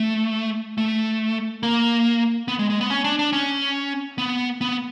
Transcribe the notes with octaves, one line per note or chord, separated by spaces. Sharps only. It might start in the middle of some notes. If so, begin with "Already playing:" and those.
Already playing: A3
A3
A#3
B3
G#3
G#3
B3
C#4
D4
D4
C#4
B3
B3